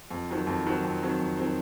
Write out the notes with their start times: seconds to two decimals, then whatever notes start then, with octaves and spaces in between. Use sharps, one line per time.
0.11 F2
0.29 D#3 F#3 C4
0.47 F2
0.66 D#3 F#3 C4
0.84 F2
1.02 D#3 F#3 C4
1.19 F2
1.37 D#3 F#3 C4